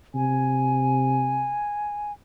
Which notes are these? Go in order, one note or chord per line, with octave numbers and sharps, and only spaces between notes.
C3 G#5